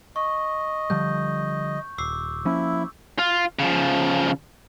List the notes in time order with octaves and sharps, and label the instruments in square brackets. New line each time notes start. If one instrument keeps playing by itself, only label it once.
[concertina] D#5 [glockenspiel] C#6
[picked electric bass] D3 F3 G3 [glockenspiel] G6
[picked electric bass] D#1 [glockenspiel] D6 E6 C7
[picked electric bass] F3 A#3 C#4 [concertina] E4
[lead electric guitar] F4
C#3 F3